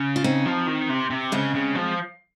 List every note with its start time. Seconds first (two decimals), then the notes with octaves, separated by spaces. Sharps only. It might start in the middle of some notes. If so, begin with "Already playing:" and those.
Already playing: C#3
0.16 F4
0.24 C4 D#4
0.46 F3
0.67 D#3
0.90 C3
1.10 C3
1.32 C#3 G#3 C4
1.55 C#3
1.75 F3